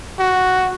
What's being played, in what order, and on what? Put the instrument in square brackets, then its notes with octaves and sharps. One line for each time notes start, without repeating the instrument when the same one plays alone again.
[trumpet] F#4